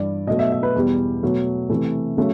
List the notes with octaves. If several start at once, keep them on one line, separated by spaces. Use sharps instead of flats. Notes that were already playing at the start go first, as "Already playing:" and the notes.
Already playing: G2 E3 G3 D5
B2 F#3 A3 D#5
E5
E5
B4
E2 B2 G3
B2 F#3 A3
C3 E3 A3
C#3 F#3 A3